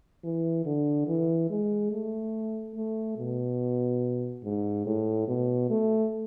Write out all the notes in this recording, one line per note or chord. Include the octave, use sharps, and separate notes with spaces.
E3
D3
E3
G#3
A3
A3
B2
G#2
A2
B2
A3